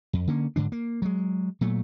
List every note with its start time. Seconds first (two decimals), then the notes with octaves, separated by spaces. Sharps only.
0.13 F2
0.28 D3 A#3 C#4
0.56 G#2 D3 D4
0.72 A#3
1.02 F#3 G#3
1.61 A#2 F#3 A3